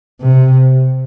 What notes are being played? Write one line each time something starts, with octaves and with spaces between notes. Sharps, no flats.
C3